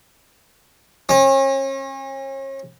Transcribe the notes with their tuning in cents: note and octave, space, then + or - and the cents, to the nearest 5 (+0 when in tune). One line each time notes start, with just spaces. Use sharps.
C#4 -40